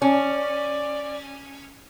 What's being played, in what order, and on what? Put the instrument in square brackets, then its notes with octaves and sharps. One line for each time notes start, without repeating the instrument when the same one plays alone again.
[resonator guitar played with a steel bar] C#4 [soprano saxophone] D5